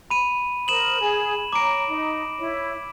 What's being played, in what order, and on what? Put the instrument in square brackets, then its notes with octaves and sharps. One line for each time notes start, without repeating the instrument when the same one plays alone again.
[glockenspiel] B5 D#7
[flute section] A#4 C5 D#6 [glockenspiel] E7 F#7
[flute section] G#4 G#5
[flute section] C#5 A#5 [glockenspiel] D6 D7
[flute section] D#4
E4 C#5